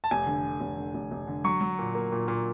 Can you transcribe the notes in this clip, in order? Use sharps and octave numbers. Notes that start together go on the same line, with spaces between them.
A5
F1 G#5
D3
D3
F1
D3
F1
F1
D3
F#3 C#6
F#3
A#2
A#3
A#2
A#2